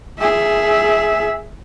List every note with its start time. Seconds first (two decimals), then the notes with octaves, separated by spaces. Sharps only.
0.19 G#4 E5